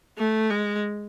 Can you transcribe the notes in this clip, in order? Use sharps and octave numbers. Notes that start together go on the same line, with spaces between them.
A3
G#3